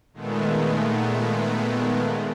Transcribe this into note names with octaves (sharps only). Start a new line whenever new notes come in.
A#2 D#3 G#3 A3 B3